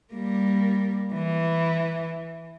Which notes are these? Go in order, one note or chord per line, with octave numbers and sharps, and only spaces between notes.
G3 A#3
E3